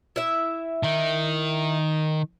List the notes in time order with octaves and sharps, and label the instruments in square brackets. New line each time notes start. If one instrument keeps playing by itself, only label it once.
[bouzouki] E4 E5
[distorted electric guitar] D#3